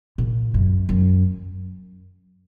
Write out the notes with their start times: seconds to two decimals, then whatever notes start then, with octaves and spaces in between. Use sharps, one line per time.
0.18 A#2
0.54 F#2
0.89 F#2